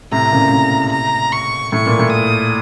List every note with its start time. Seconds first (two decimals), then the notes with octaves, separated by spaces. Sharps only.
0.11 A2 C3 A#5
0.32 A#2 C#3
0.51 A2 C3
0.92 A#5
1.32 C#6
1.72 A2 C#6
1.86 A#2
1.99 A2
2.12 D#6